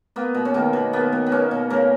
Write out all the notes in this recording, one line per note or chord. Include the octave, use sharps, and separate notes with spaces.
A#3 B3
B2
C#4
D#3 A#3 D#4
B2
A#3 B3
B2
B3
A#3 C#4
B2
C#3 A#3 A#4